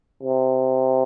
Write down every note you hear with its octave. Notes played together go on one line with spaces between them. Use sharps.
C3